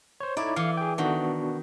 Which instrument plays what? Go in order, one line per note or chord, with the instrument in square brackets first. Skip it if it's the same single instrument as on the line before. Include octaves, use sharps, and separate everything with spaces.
[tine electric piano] C5 C#5
[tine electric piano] D#4 E4 C#5 [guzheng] D5
[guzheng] E3 [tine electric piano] F5 C#7
[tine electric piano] G#4 G5
[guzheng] D#3 [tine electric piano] B3 D4 F#4